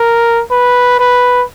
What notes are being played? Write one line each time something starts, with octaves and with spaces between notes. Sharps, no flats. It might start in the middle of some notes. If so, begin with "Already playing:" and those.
Already playing: A#4
B4
B4